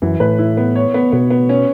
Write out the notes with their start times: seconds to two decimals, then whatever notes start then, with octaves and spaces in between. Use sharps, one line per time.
0.02 F#2 E3
0.20 A2 B4
0.39 E4
0.57 B3
0.76 C#5
0.94 B3
1.12 B2 B3
1.30 B3
1.49 C#4